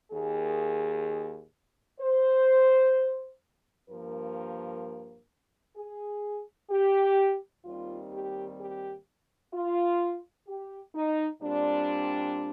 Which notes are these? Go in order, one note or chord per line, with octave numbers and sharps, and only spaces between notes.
D#2 D#3 A#3 G#4
C5
G2 F3 A#3 A#4
G#4
G4
D#2 D#3 G3 C4 F4
G4
G4
F4
G4
D#4
A#2 G3 C4 D4